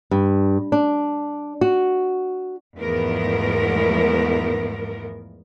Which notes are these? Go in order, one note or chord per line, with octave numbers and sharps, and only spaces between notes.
G2
D4
F#4
E2 G#2 F3 A3 B3 A#4